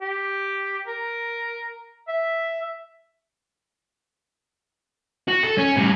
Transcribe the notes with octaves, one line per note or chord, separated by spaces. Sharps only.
G4
A#4
E5
F#4
A4
C#4
A2 G3